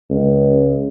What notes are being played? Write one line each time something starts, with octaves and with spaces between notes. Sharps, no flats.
C#2